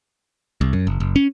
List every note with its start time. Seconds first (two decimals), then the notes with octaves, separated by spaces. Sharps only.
0.61 C2
0.73 F#2
0.87 F#1
1.00 F#1
1.16 C#4